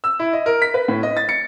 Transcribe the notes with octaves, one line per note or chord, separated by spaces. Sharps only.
E6
E4
D#5
A#4
B6
B4
A2
D#5
A6
C#7